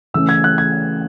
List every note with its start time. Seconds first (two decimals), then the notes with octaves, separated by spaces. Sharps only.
0.14 C#3 E3 A3 C#4 E6
0.29 G#6
0.44 F#6
0.58 G#6